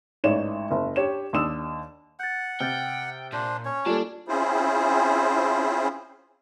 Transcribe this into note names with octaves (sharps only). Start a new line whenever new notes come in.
A1 G#2 D#4 C#5 D5 E7
F#1
D4 G4 C#5 E7
D#2 D4 D#6 E6 E7
F#5 G6 A6
C3 G5 F6 G6 A6
A#2 D4 C5
C#4 C#5
G3 A#3 F4 A4 D5 A5 E7
C4 C#4 E4 F4 G#4 C5